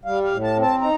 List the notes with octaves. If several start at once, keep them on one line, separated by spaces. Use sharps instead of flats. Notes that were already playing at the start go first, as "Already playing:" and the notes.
G3 F5
F5
A2
A5
C4
A5
D#4 A#5